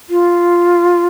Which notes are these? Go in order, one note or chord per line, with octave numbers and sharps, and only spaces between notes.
F4